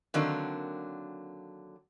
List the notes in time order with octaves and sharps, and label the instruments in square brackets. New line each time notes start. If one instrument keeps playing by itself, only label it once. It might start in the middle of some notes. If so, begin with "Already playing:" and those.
[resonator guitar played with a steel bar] D3 D#3 F#3 A#3 C4 D4